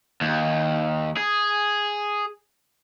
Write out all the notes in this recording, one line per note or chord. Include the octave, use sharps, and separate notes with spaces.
D#2
G#4